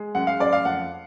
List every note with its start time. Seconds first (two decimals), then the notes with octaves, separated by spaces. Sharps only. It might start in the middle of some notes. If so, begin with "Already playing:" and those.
Already playing: G#3
0.15 F#2 F#5
0.27 F5
0.40 F#2 D5
0.53 F5
0.65 F2 F#5